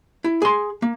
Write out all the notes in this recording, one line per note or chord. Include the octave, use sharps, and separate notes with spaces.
E4
G#4 C6
A#3